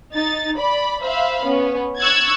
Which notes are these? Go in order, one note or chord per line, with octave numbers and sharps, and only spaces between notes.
D#4 A6
D5 B5
C5 E5 F5 B5
B3 C#4
C#6 E6 F#6 G#6 A6